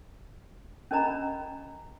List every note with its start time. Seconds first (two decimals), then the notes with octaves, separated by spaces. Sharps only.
0.91 C#4 D4 A#4 D#5 A#5 B5